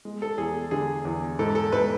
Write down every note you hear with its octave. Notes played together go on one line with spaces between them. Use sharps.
G#3
A4
E2 G#4
D3 G#4
E2
G#2 A4
A4
G#2 B4